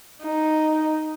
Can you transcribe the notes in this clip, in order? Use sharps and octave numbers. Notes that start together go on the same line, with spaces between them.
D#4